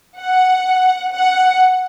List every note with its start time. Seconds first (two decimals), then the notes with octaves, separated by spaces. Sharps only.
0.18 F#5
1.13 F#5